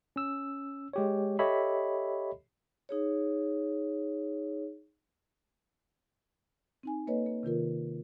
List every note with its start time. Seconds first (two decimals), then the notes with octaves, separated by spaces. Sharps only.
0.16 C#4 E6
0.93 G#3 G4 C#5
1.39 G4 A4 C#5 D#5 E5 B5
2.89 D#4 G#4 C#5
6.83 C4 D#4 G#5
7.07 A#3 A4 B4 C#5 D#5
7.26 A#3
7.43 C3 D#3 F4 A#4